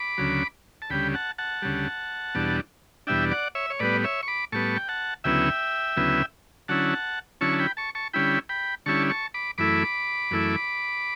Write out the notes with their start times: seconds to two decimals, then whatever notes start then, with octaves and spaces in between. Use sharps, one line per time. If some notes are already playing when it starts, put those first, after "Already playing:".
Already playing: B5 D6
0.18 D2 C#3 F#3
0.82 A5
0.90 D2 C#3 G3 G5 B5
1.14 F#5 A5
1.38 F#5 A5
1.62 D2 C#3 G3
2.35 E2 B2 G3 D4
3.07 E2 B2 G3 D4 E5 G5
3.31 D5 F#5
3.55 C#5 E5
3.70 C#5
3.79 A2 G3 B3 B4 D5
4.04 C#5 E5
4.23 C#6
4.28 B5 D6
4.52 A2 G3 B3 A5 C#6
4.77 G5
4.88 F#5 A5
5.24 D2 C#3 F#3 B3 E4 E5 G5
5.97 D2 C#3 F#3 B3 E4
6.68 D3 F#3 C#4 E4 F#5 A5
7.41 D3 F#3 C#4 E4 A5 C#6
7.53 A5
7.59 G5 B5
7.77 A5 C#6
7.95 A5 C#6
8.13 D3 G3 C#4 E4 G5 B5
8.49 G5 B5
8.86 D3 G3 C#4 E4 A5 C#6
9.10 A5 C#6
9.34 B5 D6
9.58 F#2 E3 A3 E4 B5 D6
10.31 F#2 E3 A3 E4